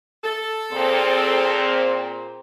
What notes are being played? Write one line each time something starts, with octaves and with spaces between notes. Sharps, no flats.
A4
A#2 C4 G#4 C5